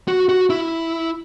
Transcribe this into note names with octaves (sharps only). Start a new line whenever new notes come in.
F#4
F#4
E4